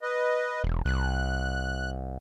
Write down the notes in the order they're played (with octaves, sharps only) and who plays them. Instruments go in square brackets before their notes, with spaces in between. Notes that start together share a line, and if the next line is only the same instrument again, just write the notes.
[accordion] B4 D#5
[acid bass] E1
[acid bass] C2 [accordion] F#6